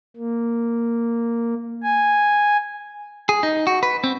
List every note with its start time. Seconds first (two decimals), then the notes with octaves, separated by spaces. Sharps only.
0.16 A#3
1.83 G#5
3.29 G#4
3.43 D#4
3.67 F#4
3.83 B4
4.04 C4